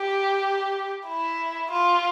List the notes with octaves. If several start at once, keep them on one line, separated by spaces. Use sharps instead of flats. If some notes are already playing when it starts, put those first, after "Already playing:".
Already playing: G4
E4
F4